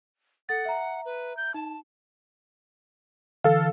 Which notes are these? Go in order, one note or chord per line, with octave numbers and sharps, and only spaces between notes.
A4 F#5 A6
E5 A#5
B4
G6
D#4 A5
D3 E3 A4 F5